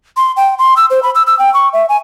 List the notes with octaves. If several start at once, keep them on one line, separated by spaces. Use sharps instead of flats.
C6
G5
C6
E6
C5
B5
E6
E6
G5
C#6
E5
G#5